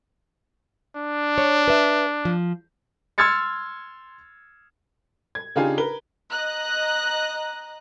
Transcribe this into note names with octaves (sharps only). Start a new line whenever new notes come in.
D4
C#5
B4 E5
F3
C6 E6 F6 G#6 A6 C#7
G#6
C#3 D4 D#4 F4 G4 G#5
A#4 B4 G7
D#5 A#5 F#6